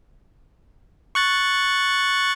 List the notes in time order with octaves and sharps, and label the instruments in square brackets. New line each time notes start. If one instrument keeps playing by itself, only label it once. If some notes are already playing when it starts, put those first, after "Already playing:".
[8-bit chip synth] C#6 F#6 A6